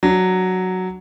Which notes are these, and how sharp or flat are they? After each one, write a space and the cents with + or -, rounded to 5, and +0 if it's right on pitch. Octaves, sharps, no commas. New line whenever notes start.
F#3 +0 D4 -10